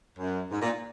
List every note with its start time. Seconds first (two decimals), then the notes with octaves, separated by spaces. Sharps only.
0.18 F#2
0.51 G#2
0.62 A#2